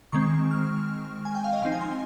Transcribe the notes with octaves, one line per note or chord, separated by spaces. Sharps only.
D#3 G#3 C4 C#6
F6
G#5
G5
F5
D#5
F3 C4 D#4 F5
G#5
C6